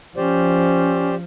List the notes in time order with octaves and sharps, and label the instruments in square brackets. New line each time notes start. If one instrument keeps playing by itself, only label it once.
[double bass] F3 [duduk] C#4 [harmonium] G4 C5 D5